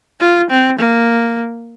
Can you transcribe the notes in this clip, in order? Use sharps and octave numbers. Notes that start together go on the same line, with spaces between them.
F4
C4
A#3